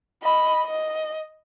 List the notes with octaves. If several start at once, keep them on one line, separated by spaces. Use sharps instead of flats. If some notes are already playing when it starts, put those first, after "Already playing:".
D#5 B5
D#5